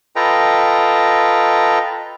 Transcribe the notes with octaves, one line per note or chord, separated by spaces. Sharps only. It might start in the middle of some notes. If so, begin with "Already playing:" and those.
F4 A4 B4 D#5 G5 A#5